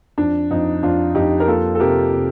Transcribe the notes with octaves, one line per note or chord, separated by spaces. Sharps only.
F2 D4
F2 D#4
F2 D4 F4
F2 D#4 G4
A#4
A#3 F4 A4
A4
C3 G4 A#4
C3